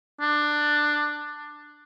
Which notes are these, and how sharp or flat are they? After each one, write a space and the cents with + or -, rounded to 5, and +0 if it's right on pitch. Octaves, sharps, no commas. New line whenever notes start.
D4 +15